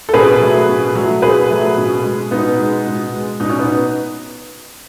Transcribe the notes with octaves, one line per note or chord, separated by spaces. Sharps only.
A4
B2 G#4 B4
F#3 A3
B2
F#3 A3
B2 G#4 B4
F#3 A3
B2
G#3
B2 B3 D#4
G#3
B2
G#3
B2 D#4
C#4
B3 D#4